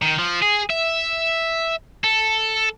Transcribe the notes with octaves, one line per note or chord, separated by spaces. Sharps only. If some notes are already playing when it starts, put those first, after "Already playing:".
D#3
F3
G#4
E5
A4